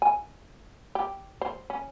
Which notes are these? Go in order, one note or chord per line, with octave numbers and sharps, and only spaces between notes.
G#5
G4
C5
C#4